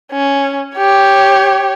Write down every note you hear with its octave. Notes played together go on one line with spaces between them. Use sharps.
C#4
G4 C#5